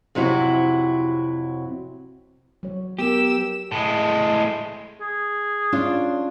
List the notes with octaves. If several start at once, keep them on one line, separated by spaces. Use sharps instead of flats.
F2 C3 F#3 E4 F#4
F#3 C#5
B3 G4 A#4 E6
A2 G#3
G#4
C#4 D4 F4